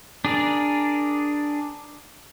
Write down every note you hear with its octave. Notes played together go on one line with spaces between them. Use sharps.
D4 G#4 A#4 D5